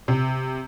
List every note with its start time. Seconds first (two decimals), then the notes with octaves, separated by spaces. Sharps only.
0.08 C3